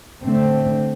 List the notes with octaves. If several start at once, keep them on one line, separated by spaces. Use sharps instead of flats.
D3 A3 C4